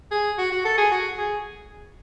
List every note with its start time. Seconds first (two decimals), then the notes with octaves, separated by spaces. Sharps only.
0.12 G#4
0.38 F#4
0.52 F#4
0.65 A4
0.78 G#4
0.91 F#4
1.18 G#4